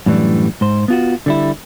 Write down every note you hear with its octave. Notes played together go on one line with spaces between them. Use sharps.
F#2 A2 E3 G3 D4
G#2 C5
B3 F4 F#4
D3 G3 E4